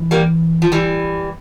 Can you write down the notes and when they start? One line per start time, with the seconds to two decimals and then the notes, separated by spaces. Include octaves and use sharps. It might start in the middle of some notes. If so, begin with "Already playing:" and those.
Already playing: E3
0.11 G3 A#3
0.62 F3
0.72 E3 G3